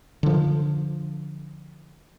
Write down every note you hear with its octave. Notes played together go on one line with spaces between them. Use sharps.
D3 F3